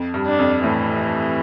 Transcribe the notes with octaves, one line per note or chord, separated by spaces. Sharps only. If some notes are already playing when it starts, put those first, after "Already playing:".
Already playing: F2
G2
D4
F2
A2 E3